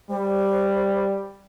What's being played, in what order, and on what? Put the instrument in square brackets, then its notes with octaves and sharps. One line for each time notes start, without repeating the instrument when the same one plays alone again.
[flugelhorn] G3 [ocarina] C5